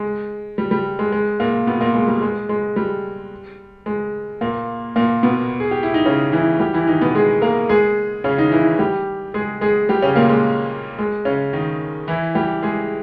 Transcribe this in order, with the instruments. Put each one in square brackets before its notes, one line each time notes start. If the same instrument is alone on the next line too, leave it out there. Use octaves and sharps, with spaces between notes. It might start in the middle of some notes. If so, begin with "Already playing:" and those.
Already playing: [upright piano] G#3
G3
G3
G#3
G#3
A#2 A#3
B2 B3
A#2 A#3
G#3
G3
G#3
G#3
G3
G#3
A#2 A#3
A#2 A#3
B2 B3
G#4
G4
E4
D#4
C#3 C#4
E3 E4
G3 G4
E3 E4
D#3 D#4
B2 B3
G#3 G#4
A#3 A#4
G#3 G#4
C#3 C#4
D#3 D#4
E3 E4
G3 G4
G#3 G#4
G#3 G#4
G3 G4
C#3 C#4
A#2 A#3
G#3
G#3
C#3 C#4
D#3 D#4
E3 E4
G3 G4
G#3 G#4